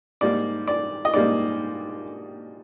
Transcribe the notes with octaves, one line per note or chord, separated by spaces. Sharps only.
G#2 G3 A#3 D5
D5
D#5
G#2 G3 A#3 D5